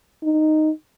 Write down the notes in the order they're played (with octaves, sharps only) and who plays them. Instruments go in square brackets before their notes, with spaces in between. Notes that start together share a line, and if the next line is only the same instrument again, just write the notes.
[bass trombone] D#4